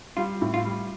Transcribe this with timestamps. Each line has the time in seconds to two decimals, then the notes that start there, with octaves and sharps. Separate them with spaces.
0.17 G3 F4
0.41 A2
0.54 F4
0.66 G3